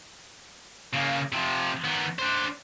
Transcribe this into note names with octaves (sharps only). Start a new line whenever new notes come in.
C#3 A#3
C3 F3
D#3 B3
D4 C5